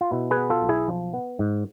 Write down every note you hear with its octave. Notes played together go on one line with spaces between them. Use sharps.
F4
B2 E4
G#4 B4
B3
F4 A4
B1
E4 G#4
F3
B3
G#2